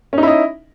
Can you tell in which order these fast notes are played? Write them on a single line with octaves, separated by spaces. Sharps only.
C#4 D#4 E4 D#5